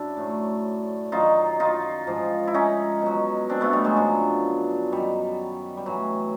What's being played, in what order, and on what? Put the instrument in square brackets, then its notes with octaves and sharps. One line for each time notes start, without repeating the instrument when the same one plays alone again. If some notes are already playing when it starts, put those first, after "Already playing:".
Already playing: [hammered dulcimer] F#2 D4 E4
A2 F#3
F#2 D#3 F#3 D#4 F4
D#4 F4
G#2 F3
E4
C#4 D#4
B2 F#3
C4 D4
A3 B3
G3 A3
F#3 G#3
F#2 D3 F3 F#3
F#2 D#3 F#3 G3
G3
A2 E3 F#3